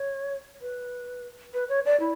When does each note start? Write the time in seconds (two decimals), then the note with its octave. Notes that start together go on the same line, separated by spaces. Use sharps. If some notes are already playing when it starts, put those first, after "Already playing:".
Already playing: C#5
0.62 B4
1.54 B4
1.69 C#5
1.85 D5
2.00 E4